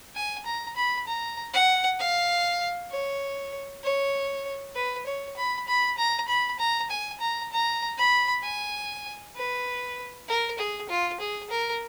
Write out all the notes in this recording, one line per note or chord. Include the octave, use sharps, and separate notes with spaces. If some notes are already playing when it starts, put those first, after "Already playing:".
G#5
A#5
B5
A#5
F#5
F5
C#5
C#5
B4
C#5
B5
B5
A#5
B5
A#5
G#5
A#5
A#5
B5
G#5
B4
A#4
G#4
F4
G#4
A#4